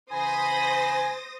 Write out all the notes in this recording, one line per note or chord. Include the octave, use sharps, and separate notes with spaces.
C#3 E3 C5 G#5 B5 D#6 A#6